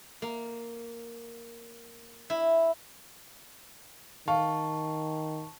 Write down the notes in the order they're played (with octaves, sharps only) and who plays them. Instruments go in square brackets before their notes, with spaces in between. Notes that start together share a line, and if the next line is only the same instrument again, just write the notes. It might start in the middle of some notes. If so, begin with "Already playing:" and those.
[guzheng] A#3
E4
[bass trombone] D#3 [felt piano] F5 [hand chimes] A5 C#6